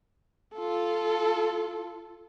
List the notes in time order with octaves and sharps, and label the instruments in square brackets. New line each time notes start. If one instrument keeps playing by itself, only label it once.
[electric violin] F4 A4